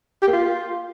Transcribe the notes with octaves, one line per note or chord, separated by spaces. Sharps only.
G4
A#3
F4